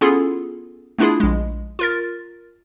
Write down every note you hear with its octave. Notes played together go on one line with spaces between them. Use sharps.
B3 C#4 E4 F4 G#4 A4
A3 B3 D4 E4 F4 G#4
A#1 G#3
F4 A#4 A6